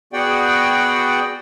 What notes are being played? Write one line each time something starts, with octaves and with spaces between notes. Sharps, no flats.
B3 F#4 G#4 D5 F#5 G5